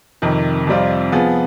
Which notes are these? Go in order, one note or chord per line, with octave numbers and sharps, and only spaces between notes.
F2 C3 D#3
F2 C3 G3 C4 F4
F3 B3 F4 G#4